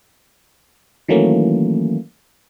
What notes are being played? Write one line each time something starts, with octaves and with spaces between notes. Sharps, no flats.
D#3 E3 F#3 A3 A#3 C#4